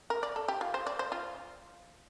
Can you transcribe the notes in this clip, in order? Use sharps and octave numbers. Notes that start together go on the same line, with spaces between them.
A#4
D5
A4
G4
F4
C5
D5
C5
F4